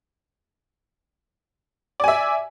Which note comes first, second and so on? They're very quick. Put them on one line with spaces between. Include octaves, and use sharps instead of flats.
D5 G#5 E5